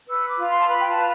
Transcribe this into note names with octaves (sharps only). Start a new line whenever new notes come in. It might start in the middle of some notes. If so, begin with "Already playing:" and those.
B4 E6
D6
F4
C6
A5
B4 B5
G5
A5
F4